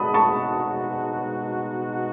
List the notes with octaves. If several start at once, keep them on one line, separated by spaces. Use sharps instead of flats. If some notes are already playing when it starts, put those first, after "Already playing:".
Already playing: B2 G#3 D#4 F#4 A5 B5 D#6
A5 C#6